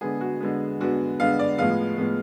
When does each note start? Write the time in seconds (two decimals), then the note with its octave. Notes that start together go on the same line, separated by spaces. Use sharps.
0.01 D3 G#3 B3 G#4
0.21 F#4
0.41 D3 G#3 B3
0.80 D3 G#3 B3 F#4
1.20 D3 G#3 B3 F5
1.39 D5
1.58 A2 F3 G#3 B3 F5
1.98 A2 F3 G#3 B3